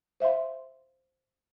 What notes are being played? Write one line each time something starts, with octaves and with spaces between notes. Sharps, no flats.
C5 E5 F5 C6